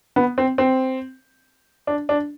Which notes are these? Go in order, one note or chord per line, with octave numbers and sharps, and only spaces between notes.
B3
C4
C4
D4
D4